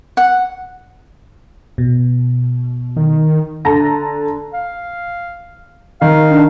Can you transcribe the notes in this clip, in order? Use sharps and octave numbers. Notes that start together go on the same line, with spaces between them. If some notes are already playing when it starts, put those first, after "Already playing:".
F#5
B2
D#3
D3 A5 A#5 A#6
F5
D#3 F5
D4